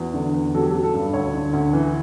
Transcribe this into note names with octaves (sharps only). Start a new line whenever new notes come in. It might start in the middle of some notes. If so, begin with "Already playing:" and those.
Already playing: E2 F#4
D3
E2
F#3 A4
G4
F#3 A4
A4
G2
D2 C#5
D3
D2
E3